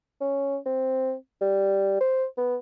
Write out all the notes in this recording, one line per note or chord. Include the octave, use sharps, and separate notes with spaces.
C#4
C4
G3
C5
B3